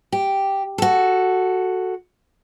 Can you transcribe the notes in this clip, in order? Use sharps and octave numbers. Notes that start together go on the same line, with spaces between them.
G4
F#4 A4